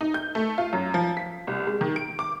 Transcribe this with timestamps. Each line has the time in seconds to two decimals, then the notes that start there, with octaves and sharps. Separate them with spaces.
0.01 D#4
0.14 G6
0.35 A3
0.58 F4
0.73 F#2
0.94 F3
1.17 B6
1.47 C2
1.67 G#3
1.81 D#3
1.96 D7
2.19 D6